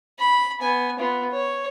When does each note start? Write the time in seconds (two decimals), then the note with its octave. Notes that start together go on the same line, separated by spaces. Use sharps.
0.19 B5
0.61 B3 G#5
0.99 B3 F4
1.31 C#5